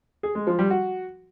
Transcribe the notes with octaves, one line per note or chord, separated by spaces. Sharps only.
G#4
G#3
F3
G3
F#4